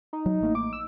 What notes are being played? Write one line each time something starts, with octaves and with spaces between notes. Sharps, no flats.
D#4
F#3
A1 A3 A#3
D6
E6